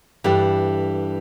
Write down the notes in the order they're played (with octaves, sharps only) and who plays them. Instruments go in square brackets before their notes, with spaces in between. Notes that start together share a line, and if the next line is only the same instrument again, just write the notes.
[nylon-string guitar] G2 E3 A3 D4 [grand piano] G4